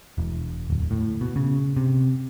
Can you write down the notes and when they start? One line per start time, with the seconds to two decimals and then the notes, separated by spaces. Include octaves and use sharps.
0.18 E1
0.70 D1
0.91 A2
1.21 B2
1.36 C#3
1.77 C3